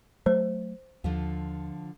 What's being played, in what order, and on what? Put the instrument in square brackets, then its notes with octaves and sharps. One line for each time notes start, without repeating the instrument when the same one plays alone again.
[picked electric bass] F#3 A3 [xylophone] C5
[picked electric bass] D#2 [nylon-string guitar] D3 F3 F4